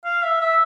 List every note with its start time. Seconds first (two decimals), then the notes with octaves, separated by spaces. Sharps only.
0.05 F5
0.23 E5
0.41 E5